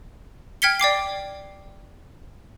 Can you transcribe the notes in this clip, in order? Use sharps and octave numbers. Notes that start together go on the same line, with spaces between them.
G5 F6 G#6 B6 C#7 G7
D5 G5 D6 C7